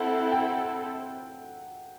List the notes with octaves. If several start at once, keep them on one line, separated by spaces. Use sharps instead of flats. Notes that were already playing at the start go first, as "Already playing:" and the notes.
Already playing: C4 E4 A4 F#5
G5